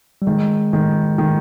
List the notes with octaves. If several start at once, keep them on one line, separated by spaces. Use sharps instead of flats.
G3
D#3 G#3
D#3
D#3